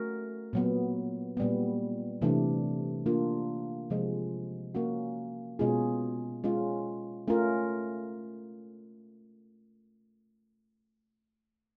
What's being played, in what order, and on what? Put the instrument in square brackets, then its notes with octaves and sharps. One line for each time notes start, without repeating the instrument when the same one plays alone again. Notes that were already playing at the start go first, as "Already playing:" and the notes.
Already playing: [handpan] A3 C#4 F#4 A#4
A#2 F#3 B3
A#2 G3 B3
C3 E3 A3 D4
A#3 D4 F4
C3 F3 G#3
A#3 C#4 F#4
B2 G#3 C#4 F4 G#4
G#3 C#4 F4
A3 C#4 F4 A#4